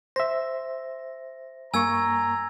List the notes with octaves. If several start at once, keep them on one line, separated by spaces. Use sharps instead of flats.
C5 E5 A#6
G2 A#3 G#5 A#5 C#6 E6 G#6